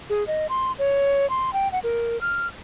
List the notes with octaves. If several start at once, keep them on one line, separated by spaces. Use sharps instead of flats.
G#4
D#5
C6
C#5
C6
G5
F#5
A#4
F6